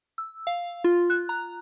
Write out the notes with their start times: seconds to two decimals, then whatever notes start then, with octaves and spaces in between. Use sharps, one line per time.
0.18 E6
0.47 F5
0.84 F4
1.10 F#6
1.29 A#5